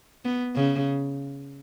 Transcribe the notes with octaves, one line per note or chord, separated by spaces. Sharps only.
B3
C#3